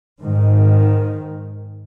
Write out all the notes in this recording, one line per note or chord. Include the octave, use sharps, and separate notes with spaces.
G#2 D#3